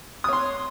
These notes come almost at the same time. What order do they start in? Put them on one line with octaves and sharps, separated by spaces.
D#6 C#5 C6